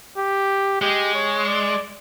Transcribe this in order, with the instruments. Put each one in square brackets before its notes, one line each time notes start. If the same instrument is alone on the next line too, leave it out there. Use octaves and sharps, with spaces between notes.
[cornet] G4
[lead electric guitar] G#3 [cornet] G4
[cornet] C#5
D5